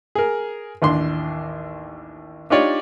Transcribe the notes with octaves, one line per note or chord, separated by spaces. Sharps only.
G#4 A#4
A1 D#2 D4 C6
D4 D#4 F4 G4 C#5 D5